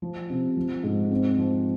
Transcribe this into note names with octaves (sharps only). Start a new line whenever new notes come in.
F3
C3
F3
G#2
C4
F3